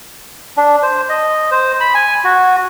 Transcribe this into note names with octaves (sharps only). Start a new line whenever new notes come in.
D4
C5
D#5
C5
B5
G#5
F#4